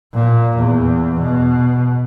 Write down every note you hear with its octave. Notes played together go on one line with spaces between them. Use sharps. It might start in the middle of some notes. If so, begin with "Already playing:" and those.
A#2
E2
B2